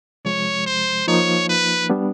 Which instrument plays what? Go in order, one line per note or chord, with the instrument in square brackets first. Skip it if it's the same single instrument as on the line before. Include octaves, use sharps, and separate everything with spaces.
[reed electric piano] C3 F3 G#3 [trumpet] C#5
[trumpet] C5
[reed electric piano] F3 A#3 D#4 [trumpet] C#5
[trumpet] B4
[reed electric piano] G3 B3 D4